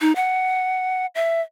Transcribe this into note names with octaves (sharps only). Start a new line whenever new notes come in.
D#4
F#5
E5